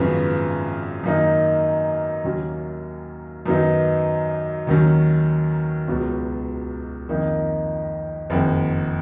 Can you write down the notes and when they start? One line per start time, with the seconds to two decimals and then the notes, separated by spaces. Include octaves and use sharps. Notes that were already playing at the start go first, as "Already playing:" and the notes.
Already playing: G#1 F#2 C#3 F3 B3
1.03 F#2 D#3 A#3 D#4
2.24 D#2 D#3 F#3 A#3 C#4
3.46 F#2 D#3 F#3 B3 D#4
4.67 D#2 D#3 F#3 C#4
5.88 C#2 B2 F#3
7.09 F2 D#3 A#3 D#4
8.30 F#1 F2 D#3